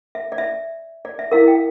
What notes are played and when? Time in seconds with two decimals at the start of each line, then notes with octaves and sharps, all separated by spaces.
0.15 E5
0.32 D5
0.38 E5
1.05 D5
1.19 E5
1.32 E4 A#4 F5
1.48 G5
1.55 F5